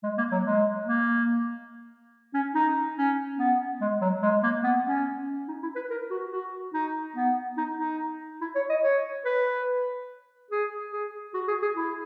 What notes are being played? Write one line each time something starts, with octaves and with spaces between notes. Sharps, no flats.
G#3
A#3
F#3
G#3
A#3
C#4
D#4
C#4
B3
G#3
F#3
G#3
A#3
B3
C#4
D#4
E4
B4
A#4
F#4
F#4
D#4
B3
D#4
D#4
E4
C#5
D#5
C#5
B4
G#4
G#4
F#4
G#4
G#4
E4